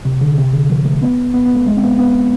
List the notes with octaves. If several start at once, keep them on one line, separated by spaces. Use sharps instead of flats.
C3
D3
C3
D3
F3
A3
B3
B3
B3
A3
G#3
C4
B3
B3